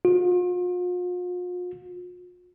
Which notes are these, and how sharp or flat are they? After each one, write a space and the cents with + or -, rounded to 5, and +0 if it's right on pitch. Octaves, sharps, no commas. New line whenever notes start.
F4 +40